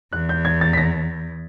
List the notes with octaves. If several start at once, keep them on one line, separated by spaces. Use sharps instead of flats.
E2 F#6
G6
G#6
A6
B6
A#6